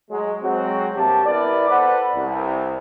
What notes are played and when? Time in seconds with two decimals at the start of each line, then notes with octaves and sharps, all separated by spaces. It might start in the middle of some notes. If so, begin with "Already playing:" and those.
0.11 F#3 G#3
0.42 F#3 G#3 C4 F#4
0.95 G2 C3 G3 A#3 G4 A5
1.26 B3 E4 A#4 B4 D5
1.70 A4 B4 C5 D5 F#5
2.15 C2